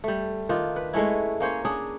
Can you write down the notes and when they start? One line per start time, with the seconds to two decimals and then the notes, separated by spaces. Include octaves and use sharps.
0.04 G3 A3
0.49 D#3 D4 F4
0.76 B4
0.93 G#3 A3 C#4 E4
1.40 A#3 C#4 C5 C#5
1.65 C#4 D4 G#4